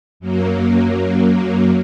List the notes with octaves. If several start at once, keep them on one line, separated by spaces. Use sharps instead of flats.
F#2 F#3 A#3